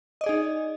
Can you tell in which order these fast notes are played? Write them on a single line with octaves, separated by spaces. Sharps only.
D#5 D5 G#4 D#4